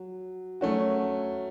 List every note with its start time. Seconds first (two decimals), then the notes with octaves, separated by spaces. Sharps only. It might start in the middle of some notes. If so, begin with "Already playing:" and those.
Already playing: F#3
0.61 F#3 A3 C#4 F#4